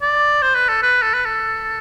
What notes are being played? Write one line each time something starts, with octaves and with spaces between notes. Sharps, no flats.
D5
C5
B4
A4
B4
A4
B4
A4